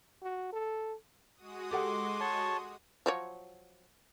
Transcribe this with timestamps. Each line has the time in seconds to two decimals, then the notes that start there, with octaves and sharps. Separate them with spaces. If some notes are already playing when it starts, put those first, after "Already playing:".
0.22 F#4
0.52 A4
1.36 G#3 F#4 D#6
1.71 G4 A4 F#5 C6 D6
2.20 C#5 A5 C#6
3.06 F3 F#3 C#5